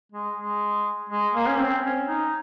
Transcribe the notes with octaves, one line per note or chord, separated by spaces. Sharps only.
G#3
G#3
G#3
A#3
C#4
C4
C#4
D#4